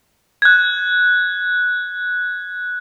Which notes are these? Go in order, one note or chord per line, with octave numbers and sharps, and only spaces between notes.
F#6 G#6